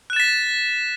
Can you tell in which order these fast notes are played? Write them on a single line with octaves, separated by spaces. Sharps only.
F#6 E7 A6 B6